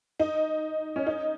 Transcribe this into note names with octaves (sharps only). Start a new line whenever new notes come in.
D#4
C#4
D#4